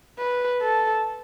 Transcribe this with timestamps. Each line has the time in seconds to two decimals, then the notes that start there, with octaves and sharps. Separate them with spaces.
0.19 B4
0.62 A4